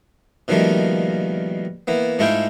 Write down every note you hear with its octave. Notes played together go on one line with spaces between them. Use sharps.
B2 D#3 F3 G3 A3 A#3
E3 A#3 B3
G#2 A3 E4 F4 G#4 G5